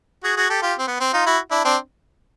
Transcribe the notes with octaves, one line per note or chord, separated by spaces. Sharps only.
F#4 G#4
F#4 G#4
G4 A4
F4 G4
C4
B3
C4
D#4 F4
E4 F#4
D4 E4
C4 D4